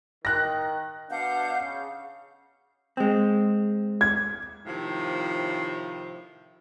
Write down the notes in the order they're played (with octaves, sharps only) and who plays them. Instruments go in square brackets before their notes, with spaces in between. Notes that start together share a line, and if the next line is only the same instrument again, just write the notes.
[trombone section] D#3 [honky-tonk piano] F#6 A#6
[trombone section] B2 D4 [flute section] F5 F#5 G6
[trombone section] C#3
[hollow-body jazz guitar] G#3 C4
[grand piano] G#6
[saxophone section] A2 C3 D#3 F3